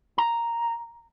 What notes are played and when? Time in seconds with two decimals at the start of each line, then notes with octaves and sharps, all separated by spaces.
0.18 A#5